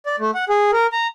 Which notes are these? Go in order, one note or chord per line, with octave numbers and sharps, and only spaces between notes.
D5
A3
F#5
G#4
A#4
A#5